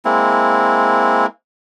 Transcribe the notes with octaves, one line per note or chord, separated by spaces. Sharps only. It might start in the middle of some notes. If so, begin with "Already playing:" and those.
G#3 A#3 C4 E4